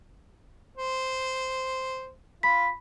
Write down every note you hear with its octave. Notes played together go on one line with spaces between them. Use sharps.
C5
F4 B5 B6